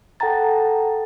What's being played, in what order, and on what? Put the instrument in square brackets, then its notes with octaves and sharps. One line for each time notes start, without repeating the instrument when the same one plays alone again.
[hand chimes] A4 F#5 G5 A5 A#5 A6